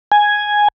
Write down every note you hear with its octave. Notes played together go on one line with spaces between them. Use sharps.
G#5